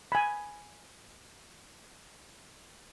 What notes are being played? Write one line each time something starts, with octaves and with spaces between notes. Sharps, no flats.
G#5 B5